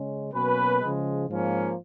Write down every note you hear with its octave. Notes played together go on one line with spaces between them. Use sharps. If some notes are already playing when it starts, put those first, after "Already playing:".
Already playing: C#3 G#3 C#4
B2 F#3 A#3 C#4 B4
C#3 F3 G#3
G#2 F3 A#3 C#4